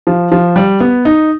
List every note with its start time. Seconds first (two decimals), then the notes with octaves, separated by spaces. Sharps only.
0.07 F3
0.32 F3
0.56 G3
0.80 B3
1.05 D#4